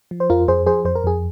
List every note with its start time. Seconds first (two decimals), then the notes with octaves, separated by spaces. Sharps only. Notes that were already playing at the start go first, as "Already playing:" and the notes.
0.11 F3
0.20 C5
0.30 F2 F4 A#4
0.48 F2 G#4 C5
0.66 F3 G#4 C5
0.85 F2 C5
0.95 A#4
1.04 F2 G#4